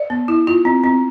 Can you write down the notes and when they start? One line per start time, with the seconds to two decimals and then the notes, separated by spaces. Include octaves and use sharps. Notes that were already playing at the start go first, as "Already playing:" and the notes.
Already playing: D5
0.10 B3
0.28 E4
0.47 F4
0.65 C4
0.84 C4